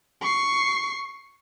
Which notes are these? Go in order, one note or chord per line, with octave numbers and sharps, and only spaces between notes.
C#6 C7